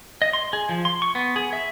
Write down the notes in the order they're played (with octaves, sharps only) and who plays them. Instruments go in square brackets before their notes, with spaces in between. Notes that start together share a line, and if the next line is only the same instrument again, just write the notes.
[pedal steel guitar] D#5
C6
G#4
F3
C6
C#6
B3
G#4
E5